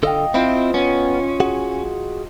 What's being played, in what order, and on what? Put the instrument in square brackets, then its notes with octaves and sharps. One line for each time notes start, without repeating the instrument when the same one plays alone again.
[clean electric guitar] D3 A4 [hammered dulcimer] D#5 F5 G5
[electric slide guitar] C4 [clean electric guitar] E4 D#5 [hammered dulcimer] F4
[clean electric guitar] B3 [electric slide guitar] C#4
[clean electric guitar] F#4 G#4 F#5